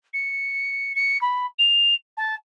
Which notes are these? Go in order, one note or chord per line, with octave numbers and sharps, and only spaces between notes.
C#7
C#7
B5
F7
A5